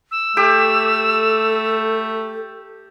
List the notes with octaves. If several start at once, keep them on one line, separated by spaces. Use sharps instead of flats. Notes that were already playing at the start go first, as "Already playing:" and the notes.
E6
A3 G4 A4 D6